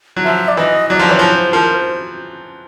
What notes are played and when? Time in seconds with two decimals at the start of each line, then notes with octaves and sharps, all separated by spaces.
0.16 F#3
0.24 F3 E5
0.48 D5
0.57 E3 D#5
0.90 F#3 D5
0.99 F3
1.09 E3 C#5
1.19 F3
1.32 C5
1.53 F3 A#4
1.74 C5